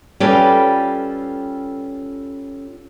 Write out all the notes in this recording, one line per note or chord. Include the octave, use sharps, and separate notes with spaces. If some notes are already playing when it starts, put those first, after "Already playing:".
G3 C#4 F4 A4 B4 D5